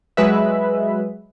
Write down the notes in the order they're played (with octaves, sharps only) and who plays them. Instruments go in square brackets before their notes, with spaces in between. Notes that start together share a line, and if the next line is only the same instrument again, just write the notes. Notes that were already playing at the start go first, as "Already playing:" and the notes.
[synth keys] F#3 G#3 B4 E5